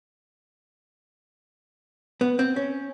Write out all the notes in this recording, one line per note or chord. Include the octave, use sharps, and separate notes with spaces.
B3
C4
C#4